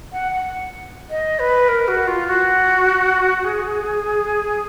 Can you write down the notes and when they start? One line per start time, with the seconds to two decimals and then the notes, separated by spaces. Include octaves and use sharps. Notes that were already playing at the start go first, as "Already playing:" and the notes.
0.13 F#5
0.32 F#5
1.10 D#5
1.39 B4
1.68 A#4
1.88 F#4
2.08 F4
2.27 F#4
3.44 G#4